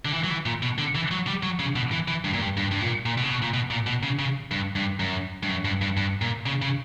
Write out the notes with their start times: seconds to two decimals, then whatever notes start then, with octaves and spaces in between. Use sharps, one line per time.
0.05 D3
0.13 E3
0.24 F#3
0.30 E3
0.46 A#2
0.63 B2
0.78 D3
0.95 E3
1.11 F#3
1.27 G3
1.43 F#3
1.59 C#3
1.76 B2
1.92 E3
2.08 E3
2.24 G2
2.33 A#2
2.41 G2
2.57 G2
2.71 G2
2.81 A#2
3.06 A#2
3.18 B2
3.24 C#3
3.30 B2
3.42 A#2
3.54 B2
3.70 A#2
3.86 B2
4.03 C#3
4.19 C#3
4.51 G2
4.76 G2
5.00 F#2
5.43 G2
5.49 F#2
5.65 G2
5.82 G2
5.97 G2
6.22 A#2
6.46 C#3
6.62 C#3